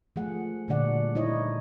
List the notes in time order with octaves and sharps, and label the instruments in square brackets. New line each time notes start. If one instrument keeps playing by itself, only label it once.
[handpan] F3 A3 G#4 F#5
A#2 D3 G3 D4 D5 F#5
D#4 E4 C#5 D#5